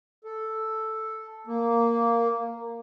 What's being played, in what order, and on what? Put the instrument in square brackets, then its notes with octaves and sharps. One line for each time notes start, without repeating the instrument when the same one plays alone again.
[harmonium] A4
A#3